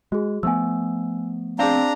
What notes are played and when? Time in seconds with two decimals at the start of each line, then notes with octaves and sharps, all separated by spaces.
0.12 G#3 F#4 G#4
0.43 F3 A3 B3 G#5 E6
1.59 C4 D4 G#4 F5 A#5